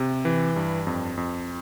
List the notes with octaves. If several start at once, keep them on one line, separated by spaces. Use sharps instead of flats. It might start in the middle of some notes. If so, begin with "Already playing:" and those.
Already playing: C3
E3
G2
F2
F2